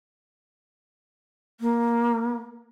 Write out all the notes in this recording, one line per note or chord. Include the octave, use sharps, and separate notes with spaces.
A#3